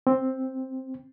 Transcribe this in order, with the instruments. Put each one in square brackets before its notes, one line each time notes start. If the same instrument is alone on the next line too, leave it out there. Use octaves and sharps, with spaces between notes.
[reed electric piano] C4